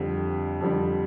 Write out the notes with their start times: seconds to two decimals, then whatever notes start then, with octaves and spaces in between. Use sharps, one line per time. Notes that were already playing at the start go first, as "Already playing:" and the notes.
Already playing: F2 D3 G3
0.61 F2 D3 G3